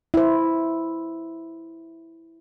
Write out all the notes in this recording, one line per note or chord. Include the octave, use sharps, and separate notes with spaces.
E4 C5